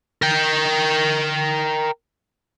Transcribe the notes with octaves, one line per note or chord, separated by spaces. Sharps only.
A#4 G5